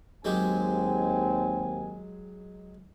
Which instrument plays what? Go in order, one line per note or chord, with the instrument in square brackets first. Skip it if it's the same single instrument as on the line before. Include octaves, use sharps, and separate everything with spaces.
[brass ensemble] D#2 C4 G#5 [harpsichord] F#3 G#3 G4